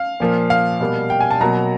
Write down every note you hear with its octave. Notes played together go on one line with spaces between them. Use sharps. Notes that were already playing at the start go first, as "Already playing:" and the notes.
Already playing: F5
A#2 F3 A#3
F5
B2 G3 A#3
G5
G#5
A5
B2 F#3 A#3 A#5